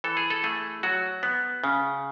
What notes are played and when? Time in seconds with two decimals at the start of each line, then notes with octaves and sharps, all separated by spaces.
0.04 E3 A4
0.17 G#4
0.30 A4
0.44 A3 G#4
0.83 F#3 F#4
1.23 B3
1.64 C#3